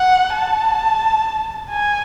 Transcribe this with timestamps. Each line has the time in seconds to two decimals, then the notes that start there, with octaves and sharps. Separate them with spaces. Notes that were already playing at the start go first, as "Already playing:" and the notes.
Already playing: F#5
0.34 A5
1.70 G#5